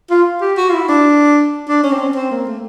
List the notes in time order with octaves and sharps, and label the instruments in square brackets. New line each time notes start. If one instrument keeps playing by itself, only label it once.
[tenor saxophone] F4
G4
F#4
F4
E4
D4
D4
C#4
C4
C#4
C4
A#3
A3